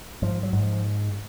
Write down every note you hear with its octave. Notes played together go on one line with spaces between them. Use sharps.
G#2 F3
F#3
G#2
F3